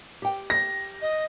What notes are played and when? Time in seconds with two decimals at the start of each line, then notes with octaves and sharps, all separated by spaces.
0.22 G4 G5
0.50 A#6
1.02 D#5